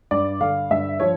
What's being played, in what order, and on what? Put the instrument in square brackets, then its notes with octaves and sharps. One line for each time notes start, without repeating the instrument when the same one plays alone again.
[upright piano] G2 D5
D3 F5
G2 E5
F3 C#5